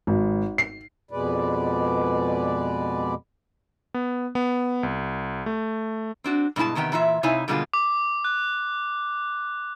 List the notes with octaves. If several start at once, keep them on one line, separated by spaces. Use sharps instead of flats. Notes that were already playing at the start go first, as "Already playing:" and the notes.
G#1
C7
F2 B2 G#3 B4 D5
B3
B3
C2
A3
C4 D4 F#4
G2 B2 G#3 E4 A5
E2 C3 D#3 B3 G5
A#2 E3 F4 E5
C3 D#4 E4 C#5 F5 G#5
B2 D3 G3 G#3 A#3 F4
D6
F#6